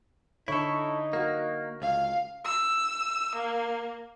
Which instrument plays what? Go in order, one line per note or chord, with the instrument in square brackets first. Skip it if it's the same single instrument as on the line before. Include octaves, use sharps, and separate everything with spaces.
[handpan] D3 C#5 [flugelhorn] D#4 [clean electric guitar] E4 A4
[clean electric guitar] A#3 [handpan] F#4 A#4
[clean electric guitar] C#2 [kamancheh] F5
[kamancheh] E6
A#3